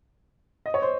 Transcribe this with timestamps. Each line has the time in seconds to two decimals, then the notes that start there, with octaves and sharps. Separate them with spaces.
0.66 D#5
0.74 C#5
0.82 C5